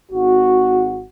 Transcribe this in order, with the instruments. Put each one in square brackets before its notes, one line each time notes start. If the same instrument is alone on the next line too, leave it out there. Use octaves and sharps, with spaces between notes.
[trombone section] G#1 F#4